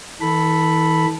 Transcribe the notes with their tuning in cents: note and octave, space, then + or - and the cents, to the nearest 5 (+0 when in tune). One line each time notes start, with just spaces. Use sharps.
E3 -40 A4 +0 B5 +0